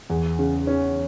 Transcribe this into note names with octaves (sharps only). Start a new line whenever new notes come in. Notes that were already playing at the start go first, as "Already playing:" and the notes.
E2
C#3
C#4